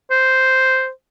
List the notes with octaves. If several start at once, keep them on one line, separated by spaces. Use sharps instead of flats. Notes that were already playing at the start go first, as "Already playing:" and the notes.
C5